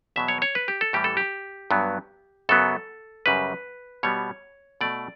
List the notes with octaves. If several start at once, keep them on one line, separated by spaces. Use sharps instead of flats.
E2 B2 F#3 E5
C#5
C#5
B4
G4
A4
A2 E3 G3 G4
A4
G4
G2 F#3 B3
F#2 C#3 F#3 B3 A4
F#2 C#3 G3 B4
B2 G3 B3 C#5
B2 A3 D5